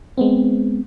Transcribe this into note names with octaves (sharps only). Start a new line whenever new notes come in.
G#3 B3 C4